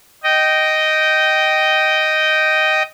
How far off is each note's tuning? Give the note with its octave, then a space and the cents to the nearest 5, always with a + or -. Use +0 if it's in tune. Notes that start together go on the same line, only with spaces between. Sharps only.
D#5 +0 G5 -15